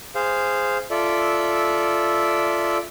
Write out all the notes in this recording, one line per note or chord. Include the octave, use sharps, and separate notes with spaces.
G#4 C5 F5
F4 A4 D5 E5